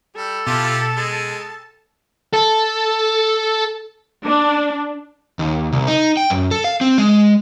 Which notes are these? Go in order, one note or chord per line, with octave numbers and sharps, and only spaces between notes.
G3 A4
B2 E4 F4 G4 A5
G#3
A4
D4
D#2
C2
D#4
G5
F#2
A4
F5
C4
G#3